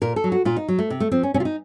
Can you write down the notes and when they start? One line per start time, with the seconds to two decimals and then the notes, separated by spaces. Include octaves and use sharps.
0.02 A#2 A#4
0.16 A4
0.24 F#3
0.32 F#4
0.45 A#2 F4
0.56 D#4
0.68 F#3
0.79 A3
0.90 C3
1.00 A3
1.12 F3 C4
1.23 C#4
1.34 C3 C#4
1.40 F4
1.45 D#4